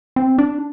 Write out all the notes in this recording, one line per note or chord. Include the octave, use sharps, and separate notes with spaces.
C4
D4